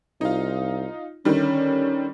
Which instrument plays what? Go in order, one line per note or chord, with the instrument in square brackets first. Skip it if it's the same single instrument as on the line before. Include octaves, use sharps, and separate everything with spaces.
[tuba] C2 [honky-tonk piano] D#4 F4
[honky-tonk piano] D3 D#3 G3 [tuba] C#4